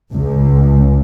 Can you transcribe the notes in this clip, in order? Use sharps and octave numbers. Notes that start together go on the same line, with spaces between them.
C#2